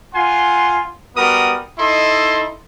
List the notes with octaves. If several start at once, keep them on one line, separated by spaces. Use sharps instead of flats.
F4 F#5 G#5 C6
G3 B3 F#4 A#4 D#6
D#4 E4 A4 D#5 C6